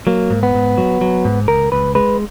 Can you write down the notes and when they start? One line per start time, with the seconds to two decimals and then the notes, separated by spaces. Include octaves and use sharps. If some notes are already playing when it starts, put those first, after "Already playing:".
0.07 F#3 A#3
0.30 G#2
0.43 B3
0.55 G#2
0.78 F#3
1.01 F#3
1.25 G#2
1.48 C#2 A#4
1.72 C#2 B4
1.95 G#3 B4